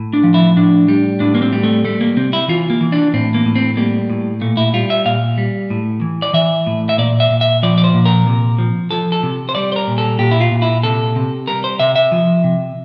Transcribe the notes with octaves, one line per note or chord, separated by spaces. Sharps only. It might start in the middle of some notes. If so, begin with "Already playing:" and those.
Already playing: A2
D4
F3
E4
A2 D4
G3
A2 D4
A#3
C4
G3
A3
G3 A3
A#3
C3 C4
E4
E3 F4
A#3
E3
D4
A2 C4
A#3
A2
C4
G3 A#3
A2
A#2 A3
E4
G3 F4
E5
A#2 F5
G3
A2
E3
D5
E3 E5
A2
E5
A#2 D5
E5
A#2
E5
F3 D5
D5
C5
A#2
A#4
C3
F3
F3 A4
A4
C3
C5
G3 D5
C5
A#4
A#2
A4
A#2 G4
E4
F4
A#2
E4
C3 A4
C3
G3 A#4
C5
C3 E5
E5
F3
C3